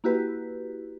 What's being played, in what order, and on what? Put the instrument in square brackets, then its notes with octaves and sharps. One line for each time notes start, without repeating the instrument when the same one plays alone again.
[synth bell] A#3 E4 F#4 G4 B4